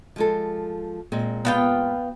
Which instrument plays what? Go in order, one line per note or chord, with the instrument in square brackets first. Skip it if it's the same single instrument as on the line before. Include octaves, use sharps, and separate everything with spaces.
[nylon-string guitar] F3 G#3 A4
A#2 G#3 C4
[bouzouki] B3 F4 G5